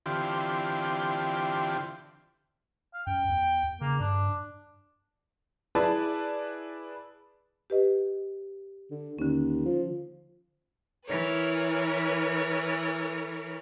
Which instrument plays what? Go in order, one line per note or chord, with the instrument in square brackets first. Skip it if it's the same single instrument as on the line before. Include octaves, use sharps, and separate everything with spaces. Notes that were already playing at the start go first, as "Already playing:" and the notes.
[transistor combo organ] D3 E3 C4 F4 G4
[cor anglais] F5
[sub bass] F#2 [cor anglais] G5
[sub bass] E2
[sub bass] C#3 [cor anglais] A#3
[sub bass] G2 [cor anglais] D4
[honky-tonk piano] E4 G#4 B4 D5 A5 B5
[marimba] G4 B4 D#5
[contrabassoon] D3
[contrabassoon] D#2 [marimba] D3 C#4
[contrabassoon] F3
[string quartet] E3 A#4 B4 C#5